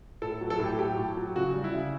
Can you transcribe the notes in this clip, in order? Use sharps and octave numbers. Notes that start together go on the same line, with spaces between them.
A2 A4
F#3
A4
A2 G4
F#3 G4
A2
F#3
C#3 F#4
G3
E4
C#3